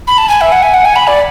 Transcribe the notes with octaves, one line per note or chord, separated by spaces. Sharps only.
B5
A5
G#5
E5
F#5
G#5
F#5
G#5
B5
D5